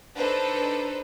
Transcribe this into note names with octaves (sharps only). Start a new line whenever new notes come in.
D4 D#4 A4 B4 C5